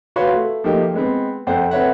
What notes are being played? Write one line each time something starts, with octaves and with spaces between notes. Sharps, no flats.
F#4 B4 C#5 F5 C6
A3
F3 A3 A#3 D#4 G4
G#3 B3 C4
F2 A4 C5 F#5
C4 A4 B4 C#5 E5 F#5